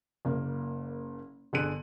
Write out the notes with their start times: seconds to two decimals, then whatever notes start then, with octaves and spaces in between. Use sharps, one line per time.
0.25 F#1 A#3
1.53 G1 D3 G#4 A4 F#6 D#7